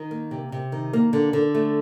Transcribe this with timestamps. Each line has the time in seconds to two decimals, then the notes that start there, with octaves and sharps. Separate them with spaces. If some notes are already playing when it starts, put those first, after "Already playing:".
Already playing: D#3
0.11 A#3
0.31 C3
0.52 C3
0.72 D#3
0.93 A#3
1.13 D3
1.33 D3
1.54 A3